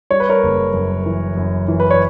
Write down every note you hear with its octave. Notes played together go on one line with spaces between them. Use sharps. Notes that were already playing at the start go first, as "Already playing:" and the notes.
G3 C#5
B4
A#4 C#5
F#1
F#2
E3
F#2
E3
B4
C#5